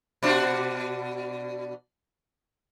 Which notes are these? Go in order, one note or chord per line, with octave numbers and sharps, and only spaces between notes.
B2 D4 F#4